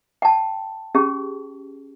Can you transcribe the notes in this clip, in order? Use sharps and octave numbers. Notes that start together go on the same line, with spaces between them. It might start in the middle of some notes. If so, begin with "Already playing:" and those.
G5 A5
C#4 G4 G#4